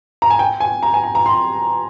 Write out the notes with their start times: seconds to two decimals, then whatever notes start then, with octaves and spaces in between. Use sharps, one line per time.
0.22 A#5
0.30 G#5
0.39 G5
0.60 G#5
0.83 A#5
0.94 G#5
1.04 A#5
1.15 A#5
1.26 C6